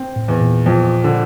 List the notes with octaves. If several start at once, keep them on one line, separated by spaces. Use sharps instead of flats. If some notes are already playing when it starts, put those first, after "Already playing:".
Already playing: C4
A2
E2
A#2
F2
D3